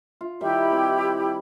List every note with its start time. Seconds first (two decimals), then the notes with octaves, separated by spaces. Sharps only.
0.21 F4
0.41 D#3 G3 E4 G4 E5 B5
0.72 C4